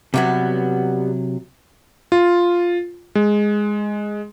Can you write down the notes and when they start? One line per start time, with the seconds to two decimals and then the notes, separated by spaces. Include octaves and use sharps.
0.14 C3 F#3 G3 A#3 B3
2.12 F4
3.15 G#3